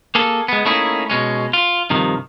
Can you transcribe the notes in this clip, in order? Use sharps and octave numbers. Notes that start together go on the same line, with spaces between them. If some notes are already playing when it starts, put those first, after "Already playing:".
A#3 G#4 A4
G#3 B3
A3 A#3 C#4 D#4 E4 G#4
B2 G#3 C#4
F4
G2 C3 D#3 F3